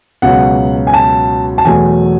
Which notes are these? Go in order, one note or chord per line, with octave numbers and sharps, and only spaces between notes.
C#2 B2 F#3 F#5
G#5
A5
A5
E2 B2 F#3 A3 G#5